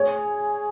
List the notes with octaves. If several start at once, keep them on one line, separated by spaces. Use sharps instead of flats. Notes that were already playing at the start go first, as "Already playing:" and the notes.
Already playing: G#4 C#5